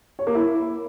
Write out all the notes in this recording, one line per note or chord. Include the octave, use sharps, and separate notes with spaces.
C#5
A#3
E4